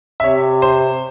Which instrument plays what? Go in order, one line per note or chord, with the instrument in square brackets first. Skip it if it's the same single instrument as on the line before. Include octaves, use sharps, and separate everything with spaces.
[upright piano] E5
[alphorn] C3 [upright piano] C#5
[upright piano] C5